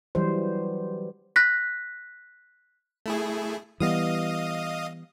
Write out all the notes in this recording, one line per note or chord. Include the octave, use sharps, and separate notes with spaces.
E3 F#3 G3 C5
F#6 A#6 B6
A3 E4 G#4
E3 G3 B3 D#5 F5 D#6